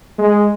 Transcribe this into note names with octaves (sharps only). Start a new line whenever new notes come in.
G#3